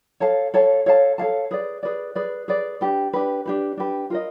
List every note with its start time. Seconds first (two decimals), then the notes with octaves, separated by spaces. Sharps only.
0.20 A4 C#5 F5 A5
0.54 A4 C#5 F5 A5
0.86 A4 C#5 F5 A5
1.18 A4 C#5 F5 A5
1.51 G#4 B4 D5
1.83 G#4 B4 D5
2.15 G#4 B4 D5
2.48 G#4 B4 D5
2.81 D4 G4 B4
3.13 D4 G4 B4
3.46 D4 G4 B4
3.77 D4 G4 B4
4.10 F4 A#4 D#5